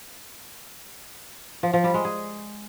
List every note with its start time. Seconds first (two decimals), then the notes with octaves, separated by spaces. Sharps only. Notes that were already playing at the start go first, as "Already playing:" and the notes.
1.63 F3
1.73 F3
1.84 G3
1.94 G#3
2.05 G#4